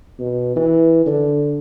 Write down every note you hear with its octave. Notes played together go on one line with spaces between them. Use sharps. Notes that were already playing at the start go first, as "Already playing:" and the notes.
B2
E3
D3